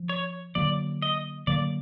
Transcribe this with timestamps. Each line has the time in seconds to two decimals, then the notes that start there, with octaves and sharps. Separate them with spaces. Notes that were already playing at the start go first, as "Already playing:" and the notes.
Already playing: F3
0.09 C#5
0.55 D3 F#3 A#3 D5
1.02 D#5
1.47 D3 F#3 A#3 D5